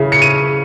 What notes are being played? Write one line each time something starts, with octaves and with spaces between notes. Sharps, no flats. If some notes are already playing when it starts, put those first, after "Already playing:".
Already playing: C#3 C#4 E4
C#7
D#7